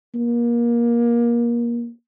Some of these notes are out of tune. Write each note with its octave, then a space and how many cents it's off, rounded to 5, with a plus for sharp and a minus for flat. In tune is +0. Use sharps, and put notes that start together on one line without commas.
A#3 +25